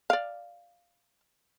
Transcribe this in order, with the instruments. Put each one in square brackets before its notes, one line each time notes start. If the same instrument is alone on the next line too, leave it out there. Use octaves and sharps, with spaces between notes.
[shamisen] D5 F5